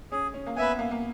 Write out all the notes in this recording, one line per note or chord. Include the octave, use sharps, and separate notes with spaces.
C#4 G#4
C#4
A#3
B3 B4 E5 G#5
A#3
A#3